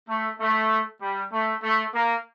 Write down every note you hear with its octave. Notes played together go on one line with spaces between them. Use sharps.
A3
A3
G3
A3
A3
A#3